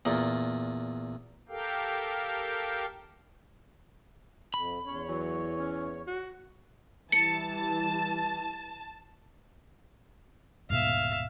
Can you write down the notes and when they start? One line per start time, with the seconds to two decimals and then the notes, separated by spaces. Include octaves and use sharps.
0.05 E2 A#2
1.49 G4 A4 A#4 F5 G5
4.54 F2 B5
4.86 E2 C#4 C#5
5.09 E3 F#3
5.59 C#4
6.07 F#4
7.12 E3 G3 A5 C#7
10.70 D#1 G#2 B2 E5 F5